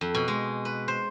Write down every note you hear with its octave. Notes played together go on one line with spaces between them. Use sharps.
F2
B2
G#3
B4
C5